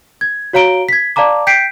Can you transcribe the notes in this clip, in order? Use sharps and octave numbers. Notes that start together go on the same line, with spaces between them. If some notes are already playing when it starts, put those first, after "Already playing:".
G#6
F#4 C#5 F5 A#5 D7 G7
G#6 B6
D5 F5 A5 A#5 D6
G5 G6 B6 C7 D7